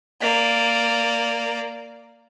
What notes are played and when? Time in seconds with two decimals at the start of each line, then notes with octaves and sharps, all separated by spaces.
0.21 A#3 D5